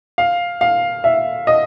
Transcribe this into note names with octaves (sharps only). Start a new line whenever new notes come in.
F5
F5
E5
D#5